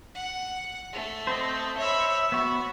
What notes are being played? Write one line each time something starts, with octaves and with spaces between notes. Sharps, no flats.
F#5
A3
C4 C5 D#5
C#5 E5 B5 E6
B3 F#4 C#6